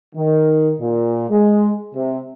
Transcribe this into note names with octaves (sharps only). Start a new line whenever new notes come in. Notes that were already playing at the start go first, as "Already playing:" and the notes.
D#3
A#2
G#3
C3